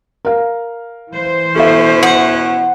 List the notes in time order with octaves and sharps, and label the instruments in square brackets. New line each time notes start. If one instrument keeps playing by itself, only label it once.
[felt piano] A#4 F5
[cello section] E3 C5
[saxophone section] B2 C#4 E4 [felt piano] A4 E5
[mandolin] F#5